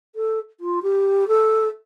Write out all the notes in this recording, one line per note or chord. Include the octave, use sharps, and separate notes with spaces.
A4
F4
G4
A4